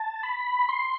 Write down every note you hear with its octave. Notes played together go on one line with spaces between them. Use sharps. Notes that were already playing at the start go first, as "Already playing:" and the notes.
Already playing: A5
B5
C6